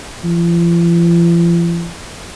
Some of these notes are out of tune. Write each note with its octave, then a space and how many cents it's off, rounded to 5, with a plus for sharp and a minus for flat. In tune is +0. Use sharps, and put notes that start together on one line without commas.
F3 -40